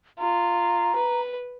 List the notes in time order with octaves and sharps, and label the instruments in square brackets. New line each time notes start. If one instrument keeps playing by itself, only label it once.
[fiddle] F4 [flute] A#5
[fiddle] B4